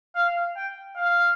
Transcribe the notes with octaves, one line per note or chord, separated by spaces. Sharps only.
F5
G5
F5